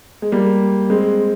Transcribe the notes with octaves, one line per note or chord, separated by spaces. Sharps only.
G#3
G3 A#3
G#3 C4